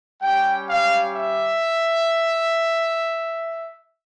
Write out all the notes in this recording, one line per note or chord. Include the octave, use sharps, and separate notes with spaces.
G3 C#4 G4 G5
F5
E5